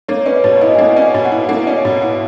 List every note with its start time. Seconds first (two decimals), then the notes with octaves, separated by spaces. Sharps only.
0.08 A#3 C#5
0.26 C#4 B4
0.44 B2 C#5
0.61 E4 D#5
0.75 G#5
0.78 A#3 F#5
0.96 C#4
1.02 G#5
1.14 B2
1.25 F#5
1.32 E4
1.45 F#5
1.49 A#3 E5
1.67 C#4
1.85 B2
2.02 E4